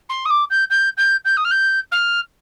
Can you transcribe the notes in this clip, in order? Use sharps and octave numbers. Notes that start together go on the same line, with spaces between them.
C6
D#6
D6
G6
G6
G6
G6
D#6
F6
G6
F6